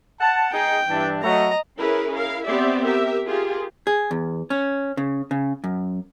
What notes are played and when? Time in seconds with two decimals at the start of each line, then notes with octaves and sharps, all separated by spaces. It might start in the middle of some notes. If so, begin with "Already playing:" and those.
0.20 F#5 A5
0.52 D#4 G#4 G5
0.89 G2 E3 D4
1.23 F#3 A3 D#5 A#5
1.79 C#4 E4 G#4 A#4 B4
2.13 E4 A#4 F5
2.45 B3 C4 G4 D5 E5
2.85 G4 A#4 E5
3.27 F4 G4 G#4 A#4
3.87 G#4
4.11 E2
4.50 C#4
4.97 C#3
5.31 C#3
5.64 F#2